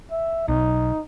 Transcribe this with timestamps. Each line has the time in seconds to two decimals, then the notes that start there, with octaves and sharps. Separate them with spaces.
0.11 E5
0.48 B1 D#4